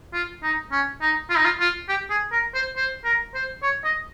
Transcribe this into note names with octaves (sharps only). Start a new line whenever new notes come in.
F4
D#4
C#4
D#4
F4
D#4
F4
F4
G4
G#4
A#4
C5
C5
A#4
C5
C#5
D#5